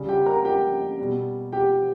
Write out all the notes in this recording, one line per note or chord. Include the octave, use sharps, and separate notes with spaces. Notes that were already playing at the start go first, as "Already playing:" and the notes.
Already playing: C#3 G3
G4 G5
A#4 A#5
G4 G5
B2 G3
G4 G5